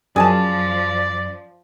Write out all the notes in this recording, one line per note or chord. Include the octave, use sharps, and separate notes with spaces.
F#2 F3 G#4 D5 G#5 A5